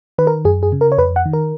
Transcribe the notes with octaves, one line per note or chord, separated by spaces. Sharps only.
D#3 B4
A#4
F#2 G#4
G#4
C#3
A#4
C#5
F2 B4
F#5
D#3
A#4